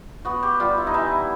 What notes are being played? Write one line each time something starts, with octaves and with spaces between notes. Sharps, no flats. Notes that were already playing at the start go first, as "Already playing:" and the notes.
B3 F#4
G4
G3 F4
E4
D#4
E3 E4